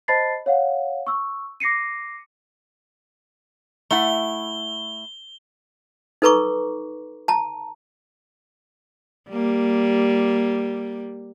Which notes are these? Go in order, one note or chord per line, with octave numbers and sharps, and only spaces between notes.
C5 D#5 A5 B5 A6 C7
C#5 F5 F#5
C#6 E6
D6 A#6 C7 C#7 D#7
A3 E4 F#5 G7
D#4 A4 B4 A#5 C#6 D6
A5 A#5
G3 A#3